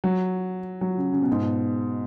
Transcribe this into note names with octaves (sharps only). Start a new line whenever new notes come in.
F#3
F#3
C#3
C#3
B2
G#2
B2